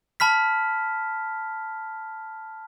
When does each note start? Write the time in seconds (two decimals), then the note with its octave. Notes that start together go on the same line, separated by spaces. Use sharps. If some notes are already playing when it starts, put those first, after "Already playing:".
0.20 A5 B5 F6 B6